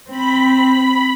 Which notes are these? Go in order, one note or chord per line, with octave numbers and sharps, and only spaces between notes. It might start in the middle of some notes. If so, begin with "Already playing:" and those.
C4 B5